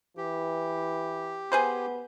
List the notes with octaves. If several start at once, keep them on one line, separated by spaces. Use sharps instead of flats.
E3 G4
B3 G#4 B4 C5